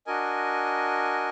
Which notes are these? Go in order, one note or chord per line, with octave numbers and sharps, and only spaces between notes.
D4 F#4 A#4 D#5 G#5